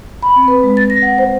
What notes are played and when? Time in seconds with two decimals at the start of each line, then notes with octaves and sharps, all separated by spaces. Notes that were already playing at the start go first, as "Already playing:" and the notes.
0.23 B5
0.36 C4
0.48 B4
0.63 G#3
0.77 A6
0.90 A#6
1.02 F#5
1.18 C5